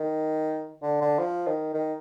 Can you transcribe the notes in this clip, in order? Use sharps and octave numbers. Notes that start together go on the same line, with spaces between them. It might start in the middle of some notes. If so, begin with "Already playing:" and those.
Already playing: D#3
D3
D3
F3
D#3
D#3